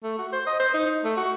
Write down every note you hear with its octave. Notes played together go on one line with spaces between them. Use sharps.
A3
F#4
C5
D#5
C5
D#4
D#4
A3
F#4